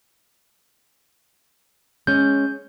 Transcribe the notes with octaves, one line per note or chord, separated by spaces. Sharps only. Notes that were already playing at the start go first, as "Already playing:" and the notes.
G#3 C#4 G6